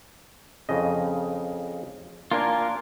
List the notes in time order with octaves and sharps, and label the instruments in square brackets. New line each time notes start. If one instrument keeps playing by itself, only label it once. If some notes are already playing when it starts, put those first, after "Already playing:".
[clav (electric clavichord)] F2 C#3 D#5
[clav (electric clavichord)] A#3 D4 [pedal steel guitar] F4 A#4 G#5